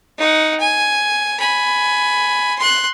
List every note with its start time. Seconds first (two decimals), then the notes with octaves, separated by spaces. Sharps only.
0.18 D#4 F#5
0.60 G#5
1.40 G#5 B5
2.59 C6 F#6